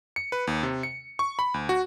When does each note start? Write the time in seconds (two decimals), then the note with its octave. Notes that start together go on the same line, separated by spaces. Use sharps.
0.16 C#7
0.32 B4
0.47 D#2
0.63 C3
0.83 C#7
1.19 C#6
1.39 B5
1.54 D2
1.69 F#4